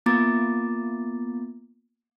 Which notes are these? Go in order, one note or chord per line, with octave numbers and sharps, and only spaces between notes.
A#3 B3 F4 A#5 D6 A6